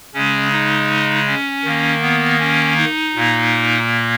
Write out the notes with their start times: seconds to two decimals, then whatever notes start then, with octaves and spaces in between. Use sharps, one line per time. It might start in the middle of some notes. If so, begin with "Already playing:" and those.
0.14 C#3 G#3 C#4
0.52 D#4
1.27 C#4
1.65 D#3 A#3
2.02 B3
2.40 C#4
2.77 D#4
3.15 A#2 A#3